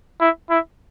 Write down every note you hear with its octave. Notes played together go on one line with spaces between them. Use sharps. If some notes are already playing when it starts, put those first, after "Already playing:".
E4
E4